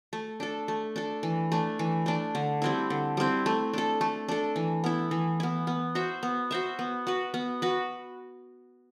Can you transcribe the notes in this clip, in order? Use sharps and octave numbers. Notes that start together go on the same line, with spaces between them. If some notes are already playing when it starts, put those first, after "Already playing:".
A3
D4 A4
A3
D4 A4
E3
A3 D4
E3
A3 D4
D3
G3 C4 E4
D3
G3 C4 E4
A3
D4 A4
A3
D4 A4
E3
B3 E4
E3
B3 E4
B3
F#4 C5 E5
B3
F#4 C5 E5
B3
F#4 B4
B3
F#4 B4